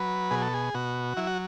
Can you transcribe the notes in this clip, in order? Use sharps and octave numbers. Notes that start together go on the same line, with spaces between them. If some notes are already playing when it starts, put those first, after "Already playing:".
Already playing: F#3 B4
B2 G#4
A4
G#4
B2 F#4
F#3 E4
F#4